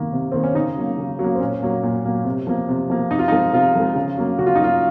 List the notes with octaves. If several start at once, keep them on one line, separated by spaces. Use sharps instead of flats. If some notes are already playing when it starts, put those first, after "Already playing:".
Already playing: C3 D#3 A#3
C3
D#3 A#3 C4
C#4
C#3 D#4
F#3 A#3
C#3
F#3
A#3
C4
A#2 C#4
F#3 A#3
A#2
F#3 A#3
C3
F3 A#3
C3
F3 A#3
C3 D#4
F4
F3 G#3 D#4
C3 F4
F3 G#3
C#3
F#3 A#3
C#3 F#4
F4
D#4
F#3 A#3 F4